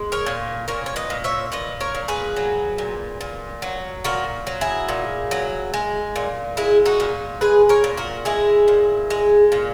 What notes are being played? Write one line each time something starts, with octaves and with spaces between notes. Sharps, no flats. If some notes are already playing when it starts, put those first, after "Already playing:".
Already playing: G#3
A#4 C#5
A#2
A#2 A#4 C#5
C#5
B4 D#5
A#2
C#5 E5
A#2 B4 D#5
A#4 C#5
A#2
G#4 B4
F#3
A#2
A#2
F#3
A#2 F#4 A#4
F#3
E4 G#4
A#2
F#3
G#3
A#2
G#3 E4 G#4
D#4 F#4
A#2
G#3 G#4 B4
A#4 C#5
A#2
F#4 A#4
G#3 E4 G#4
A#2
G#3
A#2